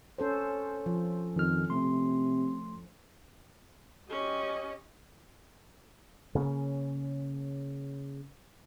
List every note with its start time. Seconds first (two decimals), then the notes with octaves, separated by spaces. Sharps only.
0.18 C#4 A4 C5
0.86 F3
1.36 F2 D#3 F6
1.70 C3 A3 C6
4.10 C#4 G4 D#5
6.35 C#3 A#3 C#4